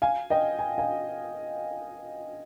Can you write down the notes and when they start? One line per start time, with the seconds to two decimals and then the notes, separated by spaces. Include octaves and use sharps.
0.02 F5 G#5
0.30 D#5 G5
0.59 G#5
0.78 F5 G#5